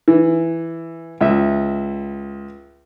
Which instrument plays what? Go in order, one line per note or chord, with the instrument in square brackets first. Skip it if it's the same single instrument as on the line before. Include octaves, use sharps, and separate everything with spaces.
[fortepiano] E3
C#2 E5